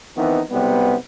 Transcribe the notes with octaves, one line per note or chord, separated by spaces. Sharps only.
D#3 E3 B3 C4 D#4
B1 C3 G3 B3